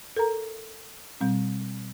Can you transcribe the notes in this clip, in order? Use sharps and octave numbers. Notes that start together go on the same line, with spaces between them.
A4 A#4 A#5
B2 G3 C4